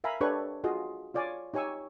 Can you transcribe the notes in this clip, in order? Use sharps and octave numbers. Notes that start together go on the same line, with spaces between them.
A#4 E5 F5 G#5 A#5 B5
D4 G4 A4 B4 C#5 C#6
F4 F#4 G#4 D#5 F5
F4 C#5 D5 F5 G#5
D#4 G4 C#5 G#5 C#6 E6